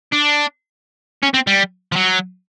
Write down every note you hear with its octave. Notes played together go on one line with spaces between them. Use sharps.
D4
C#4
C4
G3
F3
F#3